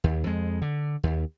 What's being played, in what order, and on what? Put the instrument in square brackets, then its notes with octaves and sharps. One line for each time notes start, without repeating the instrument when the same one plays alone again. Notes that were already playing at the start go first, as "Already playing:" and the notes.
[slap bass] D#2
F2 G#3
D3
D#2